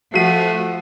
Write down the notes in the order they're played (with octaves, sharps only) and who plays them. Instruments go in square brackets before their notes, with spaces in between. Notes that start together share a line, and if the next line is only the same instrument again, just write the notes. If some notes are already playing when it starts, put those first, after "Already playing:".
[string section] F3 [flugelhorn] A3 [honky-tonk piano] F#4 D#7 [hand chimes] F#5 B6 C7